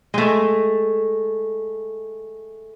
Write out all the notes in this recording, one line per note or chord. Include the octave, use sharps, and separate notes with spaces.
G#3 A3